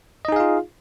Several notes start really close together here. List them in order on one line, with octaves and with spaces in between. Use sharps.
D#5 D#4 G#4 F5 F4